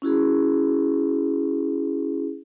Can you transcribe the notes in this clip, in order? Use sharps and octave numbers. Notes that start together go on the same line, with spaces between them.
C#4 E4 F#4 G#4